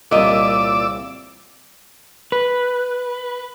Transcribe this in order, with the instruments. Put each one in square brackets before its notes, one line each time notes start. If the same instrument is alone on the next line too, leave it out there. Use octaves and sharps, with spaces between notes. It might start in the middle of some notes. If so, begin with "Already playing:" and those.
[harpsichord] C2 C#3 [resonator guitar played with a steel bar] A#2 D#5 [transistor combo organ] D5 D6 E6
[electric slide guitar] B4